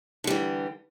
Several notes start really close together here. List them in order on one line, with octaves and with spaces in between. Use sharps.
D3 G3 E3